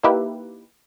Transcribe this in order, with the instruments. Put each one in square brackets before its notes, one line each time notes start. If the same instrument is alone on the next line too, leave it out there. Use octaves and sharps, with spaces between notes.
[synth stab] A#3 D#4 E4 G4 B4